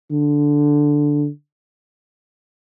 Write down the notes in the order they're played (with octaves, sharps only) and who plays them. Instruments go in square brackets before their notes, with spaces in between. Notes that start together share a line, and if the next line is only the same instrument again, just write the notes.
[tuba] D3